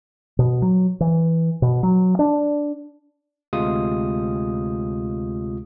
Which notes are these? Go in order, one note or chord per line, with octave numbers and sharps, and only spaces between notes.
B2
F#3
E3
B2
F#3
D4
D2 C3 G#3 F4 D#6